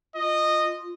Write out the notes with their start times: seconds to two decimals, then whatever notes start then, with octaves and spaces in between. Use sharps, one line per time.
0.15 F4 D#5